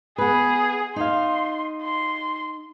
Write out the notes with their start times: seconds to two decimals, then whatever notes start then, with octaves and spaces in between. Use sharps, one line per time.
0.18 B3 G#4 B4
0.96 D#4 F5 C6
1.82 C6